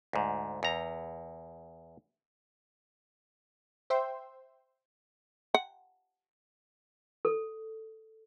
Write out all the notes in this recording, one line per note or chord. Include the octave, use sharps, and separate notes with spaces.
D2 G#2
E2 A#5
C5 E5 G5 C6
F#5
A4